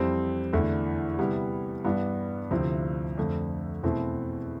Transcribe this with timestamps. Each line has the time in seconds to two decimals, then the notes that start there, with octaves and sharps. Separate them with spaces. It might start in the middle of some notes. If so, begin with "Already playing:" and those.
Already playing: F2 E3 G3 C4
0.53 E2 D3 A3 E4
1.19 C3 G3 B3 E4
1.85 G2 E3 B3 D4
2.51 D2 C3 F3 C4 E4
3.17 F2 D3 A3
3.83 E2 B2 A3 C4 E4